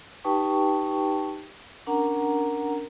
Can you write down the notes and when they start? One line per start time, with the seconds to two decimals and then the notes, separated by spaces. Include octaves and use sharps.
0.24 D#4 G4 B4 G5 A5 C#6
1.87 C#4 D4 A#4 F#5 A#5